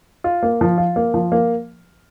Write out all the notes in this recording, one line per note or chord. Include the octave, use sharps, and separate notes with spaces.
F4
A#3
F3
F4
A#3
F3
A#3